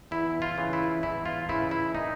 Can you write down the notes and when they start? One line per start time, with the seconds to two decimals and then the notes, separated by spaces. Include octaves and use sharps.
0.11 E2 E4
0.42 F4
0.58 C#3 E3
0.73 E4
1.03 E2 E4
1.26 F4
1.49 C#3 E3 E4
1.71 E4
1.95 A#2 D#4